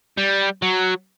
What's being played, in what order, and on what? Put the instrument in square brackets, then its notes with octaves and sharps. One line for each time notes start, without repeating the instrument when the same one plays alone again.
[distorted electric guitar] G3
F#3